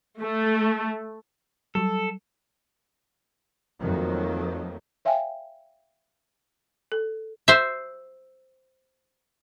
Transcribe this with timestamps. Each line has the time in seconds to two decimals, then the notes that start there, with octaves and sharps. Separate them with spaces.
0.21 A3
1.75 F#3 G3 A4
3.81 F2 D#3 F#3 A3 A#3
5.05 C#5 E5 F5 G5 G#5
6.92 A4
7.48 C5 E5